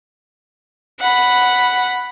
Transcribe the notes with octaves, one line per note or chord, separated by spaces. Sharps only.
F#5 B5